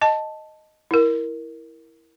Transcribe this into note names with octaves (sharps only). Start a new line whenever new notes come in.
D#5 A5
E4 A#4